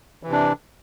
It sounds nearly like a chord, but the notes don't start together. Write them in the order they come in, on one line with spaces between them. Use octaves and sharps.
E3 C3 D4